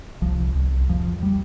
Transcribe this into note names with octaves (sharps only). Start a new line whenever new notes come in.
C2 F3
C2
F2 F3
G3